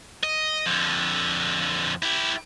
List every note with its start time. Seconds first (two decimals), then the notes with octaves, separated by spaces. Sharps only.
0.23 D#5
0.66 F2 D3
2.03 E4 G4